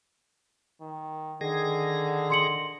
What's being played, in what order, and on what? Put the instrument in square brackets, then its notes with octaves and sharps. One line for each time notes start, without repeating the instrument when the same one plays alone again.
[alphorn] D#3
[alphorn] D3 [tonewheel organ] D#3 G#4 A#6
[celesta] C6 C#7 F#7